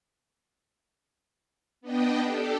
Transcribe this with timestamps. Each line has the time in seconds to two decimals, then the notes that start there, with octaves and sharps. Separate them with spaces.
1.81 B3 D4 D#5 G5
2.21 D4 G4 A4